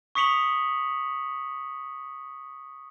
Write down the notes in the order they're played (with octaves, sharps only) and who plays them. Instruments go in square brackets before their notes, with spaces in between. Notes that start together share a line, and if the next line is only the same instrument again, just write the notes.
[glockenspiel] C#6 D#6 B6 C#7 F7 F#7